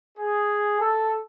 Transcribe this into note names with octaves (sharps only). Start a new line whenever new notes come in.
G#4
A4